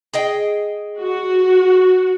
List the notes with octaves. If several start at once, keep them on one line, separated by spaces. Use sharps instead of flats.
G#4 D#5 G5
F#4